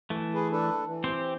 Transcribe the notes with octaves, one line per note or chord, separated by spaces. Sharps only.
E3 A3
G#4 B4
D4 A4 B4
E3
C4 G4 C5